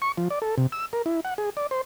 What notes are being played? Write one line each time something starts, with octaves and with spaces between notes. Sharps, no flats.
C#6
F3
D5
A4
C3
E6
A#4
E4
F#5
G#4
D5
C5